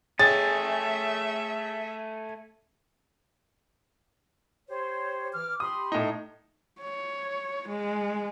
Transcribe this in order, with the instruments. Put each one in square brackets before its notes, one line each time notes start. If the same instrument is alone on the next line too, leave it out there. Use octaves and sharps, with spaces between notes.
[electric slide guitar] A3 G#5 [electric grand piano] G#4 C#5 G5 [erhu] E5 [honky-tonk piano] A6
[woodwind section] G4 C5 C#5
E3 D6 F6
[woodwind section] G4 B5 C6 [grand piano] D#6
[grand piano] A2 D#4
[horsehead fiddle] C#5
G#3